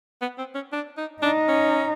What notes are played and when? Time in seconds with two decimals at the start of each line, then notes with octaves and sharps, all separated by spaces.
0.22 B3
0.39 C4
0.55 C#4
0.73 D4
0.98 D#4
1.23 D4 D#4
1.48 C#4